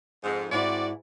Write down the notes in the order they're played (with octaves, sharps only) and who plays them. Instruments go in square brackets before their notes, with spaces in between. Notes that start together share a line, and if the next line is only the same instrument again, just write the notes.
[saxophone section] F2 G#2
[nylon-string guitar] G#2 E4 [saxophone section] C4 F#4 D5